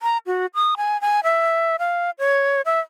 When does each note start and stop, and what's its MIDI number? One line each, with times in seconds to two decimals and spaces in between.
0.02 0.18 82
0.26 0.46 66
0.55 0.75 87
0.77 1.00 80
1.01 1.20 80
1.24 1.76 76
1.79 2.11 77
2.19 2.62 73
2.65 2.80 76